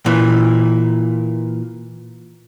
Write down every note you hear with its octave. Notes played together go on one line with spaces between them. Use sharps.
A#2 E3